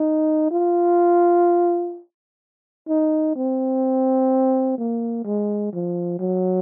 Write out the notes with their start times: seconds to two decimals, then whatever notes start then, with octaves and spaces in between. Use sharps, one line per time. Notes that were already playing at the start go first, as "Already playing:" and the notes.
Already playing: D#4
0.51 F4
2.88 D#4
3.35 C4
4.78 A#3
5.25 G#3
5.73 F3
6.19 F#3